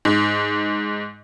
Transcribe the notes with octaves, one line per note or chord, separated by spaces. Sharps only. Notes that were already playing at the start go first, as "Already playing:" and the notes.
G#2